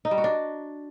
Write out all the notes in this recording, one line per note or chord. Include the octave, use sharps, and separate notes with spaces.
D#4
G3
F#4
D4